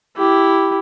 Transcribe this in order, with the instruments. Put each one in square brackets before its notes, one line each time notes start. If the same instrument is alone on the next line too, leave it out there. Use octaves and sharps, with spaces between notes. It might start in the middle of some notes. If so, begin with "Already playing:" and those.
[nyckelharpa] E4 G4